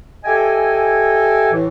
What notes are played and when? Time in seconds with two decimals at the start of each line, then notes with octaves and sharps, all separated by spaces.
0.25 G4 A4 D#5 E5 G5 G#5
1.52 A2 E3